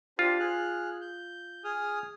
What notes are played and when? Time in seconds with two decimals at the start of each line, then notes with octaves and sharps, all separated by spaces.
0.19 D4 F4 G4 C5
0.40 G#4 F6 F#6
1.01 G6
1.64 G#4 D#6 F6